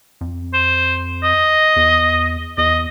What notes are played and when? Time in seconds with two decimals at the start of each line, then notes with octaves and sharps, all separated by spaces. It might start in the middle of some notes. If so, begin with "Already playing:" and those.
0.21 F2
0.54 C5
1.23 D#5
1.76 E2
2.58 E2 D#5